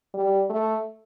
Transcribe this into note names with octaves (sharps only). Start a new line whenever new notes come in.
G3
A3